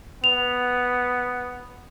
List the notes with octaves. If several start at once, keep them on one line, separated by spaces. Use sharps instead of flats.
B3 F7